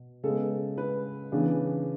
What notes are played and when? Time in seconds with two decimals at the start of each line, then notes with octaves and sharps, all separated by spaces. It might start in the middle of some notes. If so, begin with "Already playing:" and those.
Already playing: B2
0.23 C#3 G#3 B3 A4
0.78 B4
1.32 C#3 E3 B3 D4